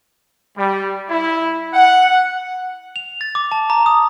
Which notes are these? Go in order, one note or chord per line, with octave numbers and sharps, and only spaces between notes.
G3
E4
F#5
F7
A6
D6
A5
A#5
D#6